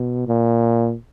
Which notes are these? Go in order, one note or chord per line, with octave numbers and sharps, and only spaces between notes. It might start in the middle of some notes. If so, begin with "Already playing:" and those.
Already playing: B2
A#2